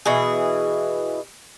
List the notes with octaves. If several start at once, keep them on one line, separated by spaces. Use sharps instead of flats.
B2 E3 G#4